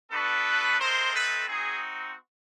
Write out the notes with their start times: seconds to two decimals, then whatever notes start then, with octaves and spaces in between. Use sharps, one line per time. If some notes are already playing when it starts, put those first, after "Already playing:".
0.11 B3 D4 F#4 A4 B4
0.79 A3 C4 D#4 A#4 C5
1.14 A4 B4
1.48 C4 D#4 F#4 G#4